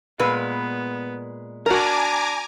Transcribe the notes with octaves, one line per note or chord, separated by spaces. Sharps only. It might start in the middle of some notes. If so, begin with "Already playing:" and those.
A#2 G#3 B3 B4
D4 F#4 A#4 G#5 A#5 D6